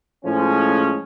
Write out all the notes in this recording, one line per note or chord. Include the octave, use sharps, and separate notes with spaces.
A2 F3 G#3 C#4